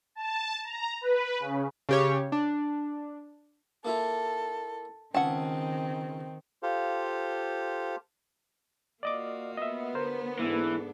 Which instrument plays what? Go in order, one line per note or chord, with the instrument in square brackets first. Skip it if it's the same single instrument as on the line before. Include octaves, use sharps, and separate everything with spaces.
[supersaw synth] A5
A#5
B4
C#3
[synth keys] C#3 G4 C#5
D4
[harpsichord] A#3 E4 F4 [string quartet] A4
[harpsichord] C#2 G#5 [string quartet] D#3 C4 [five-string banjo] F#5 A5
[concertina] F4 G4 A4 C5 F5
[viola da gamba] A#3 F4 F#4 [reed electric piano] D5 D#5 D6
[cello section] B3 [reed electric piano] D#5 E5
[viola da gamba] D3 [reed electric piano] A#4 C5
[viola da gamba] G#2 D4 A4 [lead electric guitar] E3